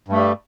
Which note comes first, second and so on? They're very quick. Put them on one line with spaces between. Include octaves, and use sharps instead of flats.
G2 A3 G3